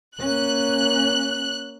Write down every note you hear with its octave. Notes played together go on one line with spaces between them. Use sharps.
A#3 C#4 F#6